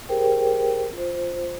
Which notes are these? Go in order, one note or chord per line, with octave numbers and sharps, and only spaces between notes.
G4 G#4 A#4 C5 G5
F4 C5